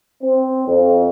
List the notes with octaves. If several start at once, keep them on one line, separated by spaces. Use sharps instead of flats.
C4
F2